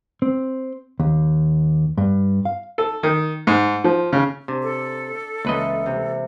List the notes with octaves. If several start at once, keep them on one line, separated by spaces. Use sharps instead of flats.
C4
D#2
G2
F5
A4
D#3
G#2
F3
C#3
C3 D4
A4
C#2 E3 G#3 A#3 B4 D#5
C3